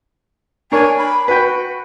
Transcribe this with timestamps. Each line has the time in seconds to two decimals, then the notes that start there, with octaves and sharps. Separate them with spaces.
0.72 D4 A#4 C#5 G#5
0.97 B5
1.28 F#4 B4 G5